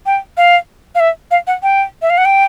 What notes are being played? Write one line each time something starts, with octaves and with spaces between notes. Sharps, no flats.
G5
F5
F5
E5
F5
F#5
G5
E5
F5
F#5
G5